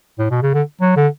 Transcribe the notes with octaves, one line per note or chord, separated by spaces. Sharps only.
A2
B2
C#3
D3
F#3
D3